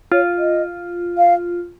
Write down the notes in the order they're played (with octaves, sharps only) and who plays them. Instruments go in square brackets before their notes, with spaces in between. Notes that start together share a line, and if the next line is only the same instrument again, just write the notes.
[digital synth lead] F4 [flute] C#5
[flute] D#5
F5